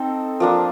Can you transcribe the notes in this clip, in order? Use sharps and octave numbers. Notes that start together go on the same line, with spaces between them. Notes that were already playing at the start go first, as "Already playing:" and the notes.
Already playing: C4 D#4 A4 C5
F3 A#3 D4